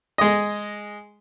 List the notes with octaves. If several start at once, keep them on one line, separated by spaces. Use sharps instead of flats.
G#3 D#5